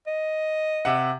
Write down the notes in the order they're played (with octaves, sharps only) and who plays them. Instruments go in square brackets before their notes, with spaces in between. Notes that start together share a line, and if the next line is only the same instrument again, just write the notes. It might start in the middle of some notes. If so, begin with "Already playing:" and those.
[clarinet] D#5
[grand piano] C3 E5 F#5